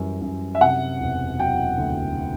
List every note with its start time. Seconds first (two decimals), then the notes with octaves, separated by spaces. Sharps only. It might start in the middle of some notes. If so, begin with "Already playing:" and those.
Already playing: F#2 E3 G3
0.21 F#2
0.55 E5
0.61 C3 F#5
1.00 E1
1.38 F#3 G5
1.78 D2